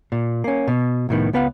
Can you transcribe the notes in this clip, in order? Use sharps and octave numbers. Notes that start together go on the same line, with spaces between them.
A#2
A#3 C#4
B2
C2 A2 D#3 B3
C#2 B3 B4 F5 F#5